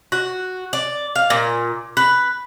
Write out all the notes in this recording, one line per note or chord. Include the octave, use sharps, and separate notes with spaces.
F#4
D5
F5
A#2
B4